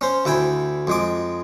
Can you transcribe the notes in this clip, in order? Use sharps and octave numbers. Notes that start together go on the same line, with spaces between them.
C#4 C5
D2 E4 G5 G#5
F2 G#3 D6